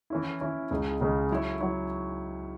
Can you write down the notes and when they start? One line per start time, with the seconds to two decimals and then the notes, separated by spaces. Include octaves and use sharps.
0.10 E3 C#4 E4
0.41 E3 C#4 E4
0.71 C#2 C#3 G#3
1.01 C#2 C#3 G#3
1.31 F#3 E4 C#5
1.61 F#3 E4 C#5